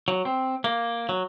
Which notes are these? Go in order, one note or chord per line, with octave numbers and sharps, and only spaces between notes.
F#3
C4
A#3
F#3